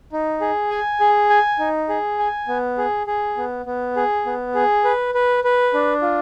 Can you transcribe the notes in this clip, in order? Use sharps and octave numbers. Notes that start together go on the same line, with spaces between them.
D#4
G#4
G#5
G#4
G#5
D#4
G#4
G#5
B3
G#4
G#4
B3
B3
G#4
B3
G#4
B4
B4
B4
D4
F4